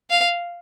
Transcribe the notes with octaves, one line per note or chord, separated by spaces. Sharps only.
F5